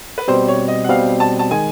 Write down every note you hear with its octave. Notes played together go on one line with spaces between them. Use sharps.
B4
B2 G3 C4 C5
C#5
D#5
F#5
B2 G3 C4 F5
A5
A5
D#3 G#3 G#5